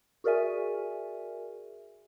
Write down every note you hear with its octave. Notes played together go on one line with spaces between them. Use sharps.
F#4 G#4 A#4 D5 E5 G#5